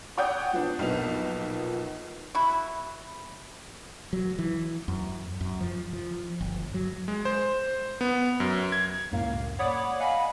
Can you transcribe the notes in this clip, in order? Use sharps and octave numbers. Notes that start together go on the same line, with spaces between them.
C#5 D5 F#5 G5 D#6 G6
F3 B3 D4
B1 A#2 F3 B3 F7
E4 F#4
F#3
E3
F#2
F#2
F3
F3
G1
F#3
G#3
C5
B3
F#2
G#6
C#2 F#2 A2 A#3 F5
C#5 D5 F#5 B5 D6 D#6
D#5 F5 F#5 G#5 B5